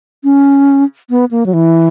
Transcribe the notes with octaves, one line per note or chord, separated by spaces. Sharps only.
C#4
B3
A#3
F#3
E3